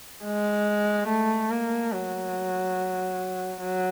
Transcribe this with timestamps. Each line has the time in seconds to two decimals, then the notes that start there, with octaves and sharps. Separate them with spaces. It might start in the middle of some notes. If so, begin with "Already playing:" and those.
0.24 G#3
1.08 A3
1.50 A#3
1.92 F#3
3.60 F#3